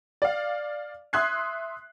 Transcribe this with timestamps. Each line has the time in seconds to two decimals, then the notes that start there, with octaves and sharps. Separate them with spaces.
0.22 D5 F5
1.13 E5 C6 D#6 F#6 G#6 C7